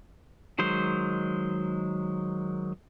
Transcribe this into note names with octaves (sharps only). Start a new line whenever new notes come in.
D#3 F#3 G#3 C5